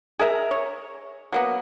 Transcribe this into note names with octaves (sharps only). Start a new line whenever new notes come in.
G#4 A#4 E5 A#5
C#5
F#3 A#3 B3